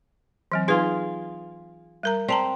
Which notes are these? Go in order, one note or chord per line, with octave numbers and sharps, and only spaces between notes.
E3 F#3 C4
D#4 F4 G#4 B4
G3 A#4 A#5
C4 D5 A5 A#5